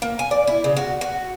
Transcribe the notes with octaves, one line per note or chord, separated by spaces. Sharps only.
A#3
G#5
D5
E4
C#3
F#4
F#4